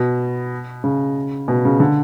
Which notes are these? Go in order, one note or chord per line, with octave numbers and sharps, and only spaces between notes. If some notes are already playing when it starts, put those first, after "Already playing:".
Already playing: B2
C#3
B2
C#3
D3